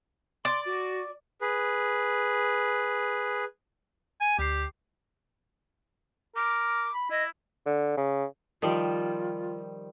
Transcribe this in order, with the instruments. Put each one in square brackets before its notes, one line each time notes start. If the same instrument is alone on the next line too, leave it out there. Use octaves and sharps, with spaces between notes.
[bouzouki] D5 [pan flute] C6
[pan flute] F#4
[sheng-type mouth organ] G#4 B4
[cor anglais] G#5
[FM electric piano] D2 C7 [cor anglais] G4
[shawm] A#4 [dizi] D6
[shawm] B5
[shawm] E4 [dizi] D#5
[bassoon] D3
C#3
[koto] D#3 F3 G3 [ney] F4